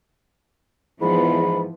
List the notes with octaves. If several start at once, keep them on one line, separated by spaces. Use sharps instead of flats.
E2 G#2 E3 F3 B3 B5